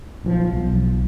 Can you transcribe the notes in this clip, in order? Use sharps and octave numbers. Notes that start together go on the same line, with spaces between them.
A#1 E3 F3
B1